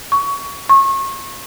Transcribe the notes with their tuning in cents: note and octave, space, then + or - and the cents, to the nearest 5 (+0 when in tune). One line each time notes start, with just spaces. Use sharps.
C#6 +20
C#6 -30